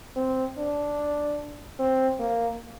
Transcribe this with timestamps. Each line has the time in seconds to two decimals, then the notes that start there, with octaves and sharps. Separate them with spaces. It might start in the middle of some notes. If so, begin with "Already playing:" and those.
0.16 C4
0.58 D4
1.79 C4
2.20 A#3